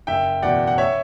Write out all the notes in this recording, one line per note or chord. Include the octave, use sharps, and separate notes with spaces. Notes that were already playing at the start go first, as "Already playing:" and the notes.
F#1 E5 G5
E2 B2 D5 F#5
F#5
C#5 E5